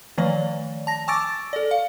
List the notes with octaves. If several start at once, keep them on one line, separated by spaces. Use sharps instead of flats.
D#3 F3 A3 C#5 D5
A5 A#6
G#5 C#6 D6 E6 A6 D7
A4 D5
F5